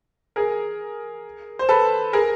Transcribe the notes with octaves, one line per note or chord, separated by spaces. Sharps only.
G#4 A#4
C5
A4 B4
G#4 A#4